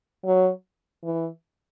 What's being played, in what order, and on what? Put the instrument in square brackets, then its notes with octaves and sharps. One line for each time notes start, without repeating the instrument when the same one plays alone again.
[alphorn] F#3
E3